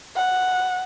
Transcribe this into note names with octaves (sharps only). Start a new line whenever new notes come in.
F#5